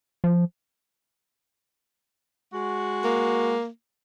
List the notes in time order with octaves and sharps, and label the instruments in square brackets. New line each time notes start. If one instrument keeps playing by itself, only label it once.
[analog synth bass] F3
[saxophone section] G#3 F#4
[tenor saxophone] A#3